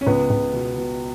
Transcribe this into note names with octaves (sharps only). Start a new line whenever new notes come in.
C#4
C#2 B3
C#2
B2
B2